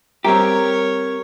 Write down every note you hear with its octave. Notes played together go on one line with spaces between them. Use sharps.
G3 C4 G4 A#4 C#5 A#5